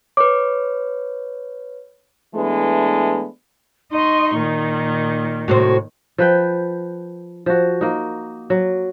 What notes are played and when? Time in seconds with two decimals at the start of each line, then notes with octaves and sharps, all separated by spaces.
0.17 B4 C#5 D6
2.35 E3 G#3 A3 B3 D4
3.91 D#4 D#5 C6 C#6
4.36 A#2 D#3
5.48 A2 C3 F#4 C5
6.18 F3 B4 G5
7.46 F3 F#4
7.81 A#3 D#4
8.50 F#3